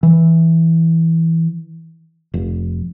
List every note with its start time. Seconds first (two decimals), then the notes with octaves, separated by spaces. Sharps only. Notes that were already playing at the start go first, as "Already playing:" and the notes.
0.03 E3
2.34 F1